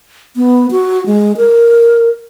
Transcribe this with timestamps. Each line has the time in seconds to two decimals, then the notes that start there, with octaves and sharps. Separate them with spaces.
0.36 B3
0.71 F#4
1.06 G#3
1.37 A#4